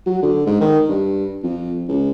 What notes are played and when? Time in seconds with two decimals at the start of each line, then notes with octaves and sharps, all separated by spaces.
0.06 F#3
0.23 D3
0.47 G#2
0.61 D#3
0.88 G2
1.43 F2
1.88 C#2